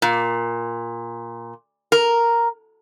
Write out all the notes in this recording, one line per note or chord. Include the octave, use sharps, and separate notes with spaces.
A#2
A#4